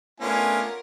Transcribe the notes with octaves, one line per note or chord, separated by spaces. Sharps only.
A3 B3 C#4 D4 F4 A#4 G#5